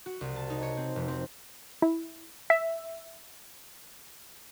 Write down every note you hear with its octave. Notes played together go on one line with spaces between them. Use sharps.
F#4
C2
A5
D#4
C#5
C4
F1
C4
E4
E5